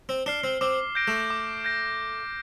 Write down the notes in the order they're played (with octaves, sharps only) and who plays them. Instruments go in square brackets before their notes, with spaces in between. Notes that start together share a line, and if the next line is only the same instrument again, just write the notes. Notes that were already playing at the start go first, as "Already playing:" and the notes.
[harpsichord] C4
[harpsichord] D4 [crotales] F6 C7 G7
[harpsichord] C4
[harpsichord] C4 [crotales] D6
[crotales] G6 A#6 D7
[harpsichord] A3
[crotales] D6
G6 A#6 D7